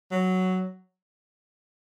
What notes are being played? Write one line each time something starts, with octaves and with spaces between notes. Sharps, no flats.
F#3